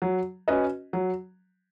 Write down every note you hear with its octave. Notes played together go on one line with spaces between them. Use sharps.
F#3
C#4 F#4 B4 D#5
F#3